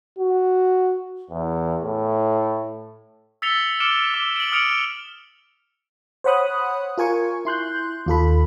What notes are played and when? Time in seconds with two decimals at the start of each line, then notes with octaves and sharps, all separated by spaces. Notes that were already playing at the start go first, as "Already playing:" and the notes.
0.18 F#4
1.30 E2
1.81 A2
3.42 E6 A6 B6 C#7 F7 G7
3.80 D6 F6 C#7 D7 E7 G7
4.14 D6 E6 G7
4.36 D7 F#7
4.52 D#6 F6 C#7 D7 F7
6.24 C5 C#5 F#5 B5 D#6 F#6
6.98 F4 A#4 G#5 C#6
7.45 E4 C6 F#6 G6
8.06 D#2 F4 A4 B5